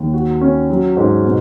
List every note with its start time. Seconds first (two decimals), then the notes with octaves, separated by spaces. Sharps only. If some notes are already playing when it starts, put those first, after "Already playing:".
Already playing: D#2
0.13 F#4
0.41 C#4
0.70 F#3
0.97 G#2
1.25 B2